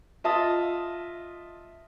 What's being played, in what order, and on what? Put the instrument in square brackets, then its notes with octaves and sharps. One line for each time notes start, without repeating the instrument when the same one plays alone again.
[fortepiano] F4 D#5 E5 A5 D#6